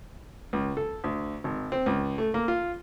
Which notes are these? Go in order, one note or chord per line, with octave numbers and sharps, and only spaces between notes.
C#2
A4
D2
G#1
C4
C#2
A3
A#3
F4